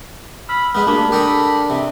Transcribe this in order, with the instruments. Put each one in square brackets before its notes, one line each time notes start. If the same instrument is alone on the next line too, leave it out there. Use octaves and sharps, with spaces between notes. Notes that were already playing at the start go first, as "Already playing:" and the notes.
[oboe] B5 [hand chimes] E6 F6
[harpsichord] G#3 B3 [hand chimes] A3 [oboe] B5
[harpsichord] A#3 [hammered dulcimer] D4 [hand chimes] F#4 G4 A#4
[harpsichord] G4 A4 A#4 [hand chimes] D6 D#6
[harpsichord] C3